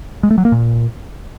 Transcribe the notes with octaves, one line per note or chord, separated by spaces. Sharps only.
G#3
A3
F#3
A#3
A#2